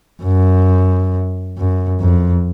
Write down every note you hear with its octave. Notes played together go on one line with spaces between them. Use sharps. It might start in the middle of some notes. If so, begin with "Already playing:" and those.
F#2
F#2
F2